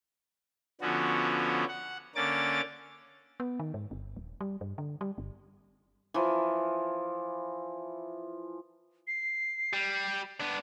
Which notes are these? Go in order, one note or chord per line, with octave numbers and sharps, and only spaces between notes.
D3 F3 B3 C#4 F#4
F#5
D3 A#3 C#4 D6 A6
B3
D#3
G#2
G1
D#1
G3
G2
D3
G3
G1
E3 F3
C7
G3
B3 D4